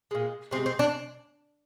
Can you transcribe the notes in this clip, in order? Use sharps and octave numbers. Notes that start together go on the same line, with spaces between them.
A#2 G#3
C3 D#3 G#3 C4
C4
D4